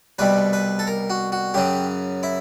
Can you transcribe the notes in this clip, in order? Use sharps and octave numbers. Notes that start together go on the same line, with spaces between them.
C2 B2 G3 B4
B4
A4
A#4
F#4
F#4
F#2 C#3 F#3 G4
E4